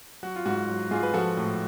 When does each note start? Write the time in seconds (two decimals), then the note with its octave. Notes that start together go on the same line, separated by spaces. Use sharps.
0.23 F#3 F#4
0.36 F4
0.46 G#2 F#4
0.69 F#3
0.91 G#2 F4 G#4
1.03 B4
1.14 F3 F#4 A4
1.37 A2